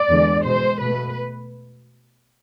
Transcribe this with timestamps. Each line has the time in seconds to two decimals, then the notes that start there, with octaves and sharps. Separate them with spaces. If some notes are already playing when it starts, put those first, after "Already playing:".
Already playing: D5
0.09 E2 D3 G#3
0.44 B2 G#3 C5
0.81 B2 A3 B4